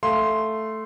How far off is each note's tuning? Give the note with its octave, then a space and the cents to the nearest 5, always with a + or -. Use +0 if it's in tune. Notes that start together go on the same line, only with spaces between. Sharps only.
A3 +0 F5 +0 C6 +0